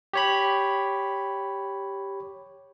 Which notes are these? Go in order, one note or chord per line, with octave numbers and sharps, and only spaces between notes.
G4 C#5 B5